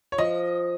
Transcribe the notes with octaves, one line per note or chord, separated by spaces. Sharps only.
C#5
F3 D#5